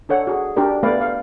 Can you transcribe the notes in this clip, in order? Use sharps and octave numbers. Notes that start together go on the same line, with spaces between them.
D4 A4 C#5 F#5
F#4 G#4
D4 F#4 G4 A#4 D5
A3 B3 B4 D5 F5
F5